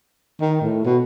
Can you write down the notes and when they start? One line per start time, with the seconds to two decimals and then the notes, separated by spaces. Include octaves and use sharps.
0.41 D#3
0.61 A2
0.85 B2